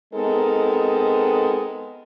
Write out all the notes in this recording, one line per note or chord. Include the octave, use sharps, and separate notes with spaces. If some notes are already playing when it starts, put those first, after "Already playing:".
G#3 B3 C4 D#4 A4 A#4